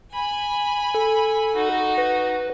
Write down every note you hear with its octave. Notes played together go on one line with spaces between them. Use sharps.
G#5 B5
A4
D#4 F#4
B4